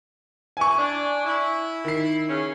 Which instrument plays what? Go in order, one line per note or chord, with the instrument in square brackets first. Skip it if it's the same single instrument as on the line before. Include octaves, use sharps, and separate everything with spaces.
[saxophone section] E3 E4 [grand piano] G#5 C#6
[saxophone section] D4
E4
[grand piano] D#3 C7
[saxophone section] C#3 C#4